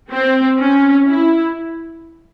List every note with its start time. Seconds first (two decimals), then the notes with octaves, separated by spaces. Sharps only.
0.11 C4
0.58 C#4
1.06 E4